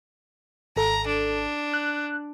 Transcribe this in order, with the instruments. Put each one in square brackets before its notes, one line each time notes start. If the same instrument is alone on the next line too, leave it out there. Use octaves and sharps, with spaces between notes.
[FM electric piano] G#1 A4 [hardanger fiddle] A#5
[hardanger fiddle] D4
[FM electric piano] F#6